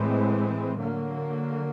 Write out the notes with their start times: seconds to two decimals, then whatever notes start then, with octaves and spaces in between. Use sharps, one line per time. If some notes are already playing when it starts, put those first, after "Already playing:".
Already playing: A2 E3 G#3 C4
0.80 D3 F#3 A#3